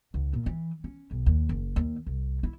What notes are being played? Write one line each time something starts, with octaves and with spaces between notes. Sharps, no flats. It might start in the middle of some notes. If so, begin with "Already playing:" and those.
C#2
A#2
E3
C#4
B1
D#2
F#1
D#2
C2
E4